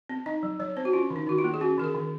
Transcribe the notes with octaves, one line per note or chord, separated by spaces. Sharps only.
C4
D#4 D#5
F#3
F#3 C#5
C4 C5
F#4
C#4 F4
D#3
D#4
D#3 F#4
F4
A#3
G#4
C#4 F#4
D#3 A#4
G#4
D#3